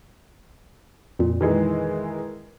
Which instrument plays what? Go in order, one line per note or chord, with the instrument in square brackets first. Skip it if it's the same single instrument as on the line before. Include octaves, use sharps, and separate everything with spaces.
[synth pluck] F2 A#2
[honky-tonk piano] D#3 E3 G#3